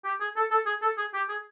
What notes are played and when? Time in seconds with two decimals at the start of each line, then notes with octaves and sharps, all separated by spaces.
0.04 G4
0.21 G#4
0.36 A4
0.51 A4
0.66 G#4
0.82 A4
0.97 G#4
1.13 G4
1.29 G#4